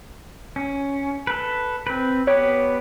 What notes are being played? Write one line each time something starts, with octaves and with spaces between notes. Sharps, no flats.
C#4
A4 B4
C4 B4
B3 G4 B4 C#5